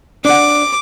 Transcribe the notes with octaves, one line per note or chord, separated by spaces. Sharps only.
D4 F#5 D6